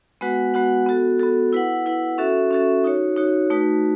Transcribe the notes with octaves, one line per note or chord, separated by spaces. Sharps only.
G#3 B3 F#4 B4 F#5
G#3 B3 F#4 B4 F#5
B3 F#4 A4
B3 F#4 A4
E4 B4 F#5
E4 B4 F#5
C#4 F#4 A4 E5
C#4 F#4 A4 E5
D#4 F#4 C#5
D#4 F#4 C#5
A3 D#4 F#4 B4